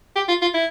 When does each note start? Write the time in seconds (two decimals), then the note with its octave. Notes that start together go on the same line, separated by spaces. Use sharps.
0.16 G4
0.28 F4
0.42 F4
0.54 E4